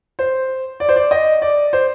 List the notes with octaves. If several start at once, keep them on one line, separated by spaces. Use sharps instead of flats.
C5
D5
C5
D5
D#5
D5
C5